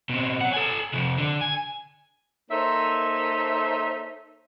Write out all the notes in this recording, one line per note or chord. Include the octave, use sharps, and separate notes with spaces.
B2 C4
C#5 F#5
A4 G#5
C3 F3
D3
G#5
A#3 D#4 A4 C5 C#5 E5